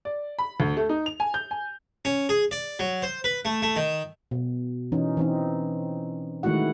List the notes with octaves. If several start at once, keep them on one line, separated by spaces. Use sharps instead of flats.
D5
B5
D2
A3
D#4
F7
G#5
G6
G#5
C#4
G#4
D5
F#3
C5
B4
A3
A3
D#3
B2
E3 C#4 D#4
E3 C4 D#4
D#3 G#3 A3 E4 F#4 F#5